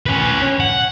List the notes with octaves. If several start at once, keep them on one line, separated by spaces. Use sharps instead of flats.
C#4 B4
F#5